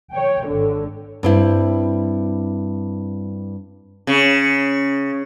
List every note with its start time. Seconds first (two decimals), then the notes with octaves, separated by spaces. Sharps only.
0.13 C#5 G5
0.46 G#1 D3
1.23 G2 C4 E4
4.07 C#3